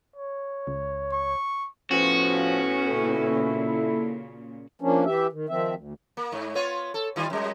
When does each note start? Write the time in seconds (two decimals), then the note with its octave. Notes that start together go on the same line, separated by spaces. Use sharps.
0.16 C#5
0.67 C#2
1.12 C#6
1.91 A2 F3 B3 C#4 F#4
2.87 A#2 C#3 E4 A4
4.81 F3 A#3 C#4 D4
5.05 E3 G4 E5
5.32 D#3
5.49 D#3 F3 C4 E5
5.75 D2
6.17 A#3
6.32 G#2
6.55 B3 F4 C#5
6.94 A4
7.16 D#3 G3 F4
7.30 F#2 G3